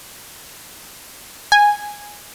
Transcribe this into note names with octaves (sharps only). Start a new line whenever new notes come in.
G#5